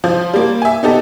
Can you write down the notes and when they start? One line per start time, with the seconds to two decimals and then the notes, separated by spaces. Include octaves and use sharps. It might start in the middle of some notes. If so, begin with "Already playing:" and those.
0.04 F3
0.33 G3 A#3
0.62 E5 G#5
0.83 B3 D#4 G4 A4